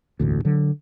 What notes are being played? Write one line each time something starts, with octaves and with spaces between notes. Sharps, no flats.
E1 A1 D2
D3 F#3